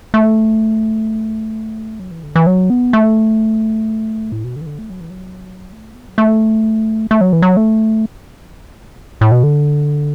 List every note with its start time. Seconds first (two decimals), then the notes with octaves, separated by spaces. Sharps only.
0.14 A3
1.99 F#3
2.11 E3
2.23 D3
2.36 E3
2.47 F#3
2.70 B3
2.93 A3
4.32 A2
4.44 B2
4.56 D3
4.61 E3
4.66 D3
4.79 A3
4.90 F#3
5.00 E3
5.10 F#3
5.72 A3
5.94 B3
6.08 F#3
6.18 A3
7.11 A3
7.21 F#3
7.33 E3
7.42 F#3
7.57 A3
9.21 A2
9.32 B2
9.43 D3